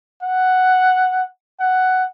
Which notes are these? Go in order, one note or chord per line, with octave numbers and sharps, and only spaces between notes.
F#5
F#5